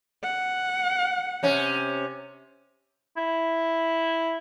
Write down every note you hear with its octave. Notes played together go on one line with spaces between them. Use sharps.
F#5
C3 C#4
E4